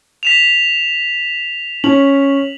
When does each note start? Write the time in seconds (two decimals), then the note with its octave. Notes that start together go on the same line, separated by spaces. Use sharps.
0.23 B6 E7 F7
1.84 C#4 F#7